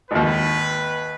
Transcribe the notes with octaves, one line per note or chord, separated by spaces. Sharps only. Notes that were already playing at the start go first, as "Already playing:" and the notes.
G#1 D#2 B4